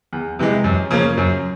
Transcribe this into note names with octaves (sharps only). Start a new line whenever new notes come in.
E2
C3 E3 G#3
F#2
C#3 F3 A#3 C#4
F#2